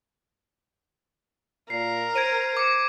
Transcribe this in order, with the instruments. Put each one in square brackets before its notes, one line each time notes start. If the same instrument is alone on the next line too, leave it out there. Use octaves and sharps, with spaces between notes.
[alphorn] A#2 [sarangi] A#4 [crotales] C7
[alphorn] C5 [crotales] G#6 D7 D#7
[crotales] D6 C#7